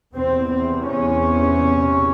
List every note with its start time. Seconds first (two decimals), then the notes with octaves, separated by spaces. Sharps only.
0.14 E2 C3 C4
0.51 C4
0.87 C#4